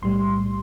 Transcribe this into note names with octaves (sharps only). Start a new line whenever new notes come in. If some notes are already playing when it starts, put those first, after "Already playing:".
B1 A2 G3 C6